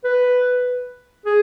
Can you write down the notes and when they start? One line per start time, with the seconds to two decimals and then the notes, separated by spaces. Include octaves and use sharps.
0.04 B4
1.26 G#4